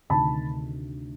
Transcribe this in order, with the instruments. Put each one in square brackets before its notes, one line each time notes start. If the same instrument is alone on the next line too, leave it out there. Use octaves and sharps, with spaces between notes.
[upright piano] D2 C3 D#3 A5 B5